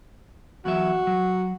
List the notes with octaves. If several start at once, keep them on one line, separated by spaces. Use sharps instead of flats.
E2 F#3 F#4 E5
F#3